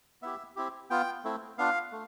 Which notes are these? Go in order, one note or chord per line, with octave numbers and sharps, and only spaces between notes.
B3 E4 G4 E5
C4 E4 G4
B3 F4 G5
A3 C4 E4
B3 D4 F4 F5
A3